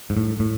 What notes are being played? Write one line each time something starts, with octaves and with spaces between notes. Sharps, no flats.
G#2
A2
A2